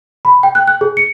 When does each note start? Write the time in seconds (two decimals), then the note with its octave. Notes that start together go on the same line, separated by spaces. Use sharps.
0.25 B5
0.43 G5
0.55 F#6
0.67 F#6
0.81 G#4
0.97 C#7